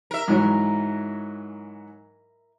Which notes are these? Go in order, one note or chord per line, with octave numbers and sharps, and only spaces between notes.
A#4 E5
G#2 E3 F#3